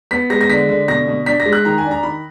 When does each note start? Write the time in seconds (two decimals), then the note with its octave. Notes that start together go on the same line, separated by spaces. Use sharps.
0.11 B3 B6
0.30 G#3 A#6
0.41 A#6
0.49 D3 B6
0.69 D3
0.88 B2 A#6
1.07 B2
1.26 D4 B6
1.40 A#6
1.46 G#3
1.52 F#6
1.65 D#3 A#5
1.78 G#5
1.84 D4
1.91 A#5
2.03 D#3 B5